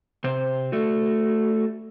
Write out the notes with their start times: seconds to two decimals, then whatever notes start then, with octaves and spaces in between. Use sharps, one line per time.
0.24 C3 C5
0.72 A3 F#4